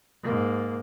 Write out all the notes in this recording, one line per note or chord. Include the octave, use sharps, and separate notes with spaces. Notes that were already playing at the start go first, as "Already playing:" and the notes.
G#2 A#3